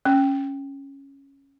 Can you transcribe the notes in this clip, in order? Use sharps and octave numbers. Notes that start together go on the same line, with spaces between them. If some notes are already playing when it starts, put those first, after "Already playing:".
C#4